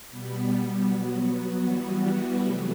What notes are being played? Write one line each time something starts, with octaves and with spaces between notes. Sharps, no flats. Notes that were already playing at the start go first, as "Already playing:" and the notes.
B2 G3 B3
F#3 B3 F#4
E3 G3 B3 F#4
C3 F#3 A3